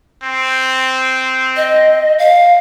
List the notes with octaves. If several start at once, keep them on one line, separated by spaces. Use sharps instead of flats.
C4
D#5
F5